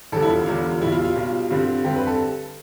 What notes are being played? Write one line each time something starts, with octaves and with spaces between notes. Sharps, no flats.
E1 E2 D3 G3 A4
E4
F4
E1 E2 D3 G3 F4
B1 B2 G3 E4
F4
F4
B1 B2 G3
G2 D3 G3 C4
G2 D3 G3 C4 G4
B4
A4